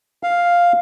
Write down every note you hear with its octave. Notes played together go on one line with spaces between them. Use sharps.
F5